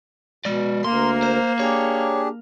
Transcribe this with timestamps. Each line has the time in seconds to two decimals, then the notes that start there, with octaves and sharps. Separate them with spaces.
0.45 B2 G#3 D5
0.84 D2 A#3 A#4 C6
1.23 C5
1.60 D4 G4 G#4 C#5